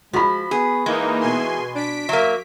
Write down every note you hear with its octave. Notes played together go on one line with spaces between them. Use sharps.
F3 G#3 F#4 B5
B3 G#4
E3 G#3 A#3 D#4
B2 G#5 C6
D4 B6 D7
F#3 A#3 E5